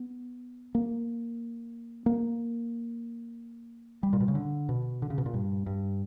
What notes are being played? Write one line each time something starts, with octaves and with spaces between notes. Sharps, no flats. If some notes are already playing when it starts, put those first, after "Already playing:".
Already playing: B3
A#3
A#3
G3
A#2
B2
C#3
D3
B2
D3
C#3
B2
A#2
G2
G2